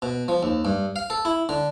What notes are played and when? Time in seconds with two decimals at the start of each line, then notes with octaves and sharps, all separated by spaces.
0.02 B2
0.28 F3
0.43 D#2
0.65 G2
0.96 F5
1.10 A4
1.25 E4
1.49 D3